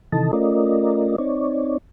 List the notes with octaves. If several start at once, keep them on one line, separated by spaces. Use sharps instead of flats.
C3 D#3 E3 A4 D#5 A5
A3 C#4 F4 A#4 D5 D#5
C4 D#4 C#5 D5